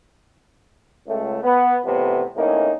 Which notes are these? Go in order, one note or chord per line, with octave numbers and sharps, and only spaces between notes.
C#2 A3
B3
C2 F2 A2 C3 E3 B3
E2 A2 A#3 C4 C#4 D#4